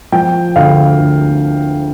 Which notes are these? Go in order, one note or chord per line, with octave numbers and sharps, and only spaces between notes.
F3 G5
D2 F5
D2